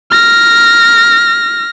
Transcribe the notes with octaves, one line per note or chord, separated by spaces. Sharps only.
F6 A#6